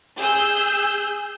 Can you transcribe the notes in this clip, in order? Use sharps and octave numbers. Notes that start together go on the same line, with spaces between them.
G#4 E6 G6